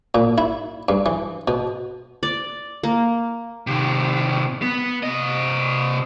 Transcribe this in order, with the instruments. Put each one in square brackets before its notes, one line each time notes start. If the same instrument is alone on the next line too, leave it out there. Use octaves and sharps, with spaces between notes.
[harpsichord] A#2
E4
G2
E3
B2
[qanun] D5
A#3
[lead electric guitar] C3 D#3
B3
C3 D#5